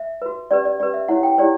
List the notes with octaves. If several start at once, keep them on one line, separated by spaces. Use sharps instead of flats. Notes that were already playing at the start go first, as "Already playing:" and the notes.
Already playing: E5
F#4 B4
C#4 G4 B4 D5
D5
C#4 G4 B4 D5
E5
E4 G4 C#5 F#5
G5
E4 G4 C#5 D5